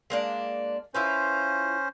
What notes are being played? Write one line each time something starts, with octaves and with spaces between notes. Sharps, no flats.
G#3 A#3 D4
C#4 E4 F4 B4 C5